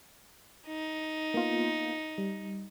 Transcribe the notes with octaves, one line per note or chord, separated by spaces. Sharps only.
D#4
A#3 B3 F4
G3